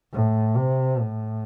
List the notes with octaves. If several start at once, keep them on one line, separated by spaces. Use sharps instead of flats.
A2
C3
A2